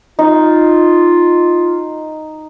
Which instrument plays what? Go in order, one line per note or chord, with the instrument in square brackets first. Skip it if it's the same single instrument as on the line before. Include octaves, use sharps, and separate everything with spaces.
[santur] D#4 [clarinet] F4